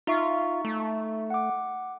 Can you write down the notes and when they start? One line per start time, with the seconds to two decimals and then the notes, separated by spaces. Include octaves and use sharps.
0.07 D#4 F4 E5 C#6
0.65 A3
1.30 F#5 D6